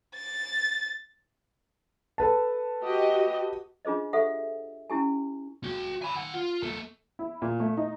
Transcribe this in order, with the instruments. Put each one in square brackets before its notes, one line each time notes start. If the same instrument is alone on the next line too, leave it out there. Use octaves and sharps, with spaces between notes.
[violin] A6
[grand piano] A4 B4 A5
[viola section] F#4 G4 D#5
[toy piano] D4 F4 G#4 C5 D#5
G4 A4 C5 E5 F#5
C#4 E4 G4 G#5
[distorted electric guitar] F#4 G5
G#5 B5
D#3 F#5
F4
A#3 A4
[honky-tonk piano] E4
A#2
A3
D#4